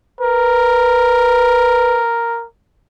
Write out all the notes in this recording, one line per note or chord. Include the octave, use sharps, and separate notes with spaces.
A#4 B4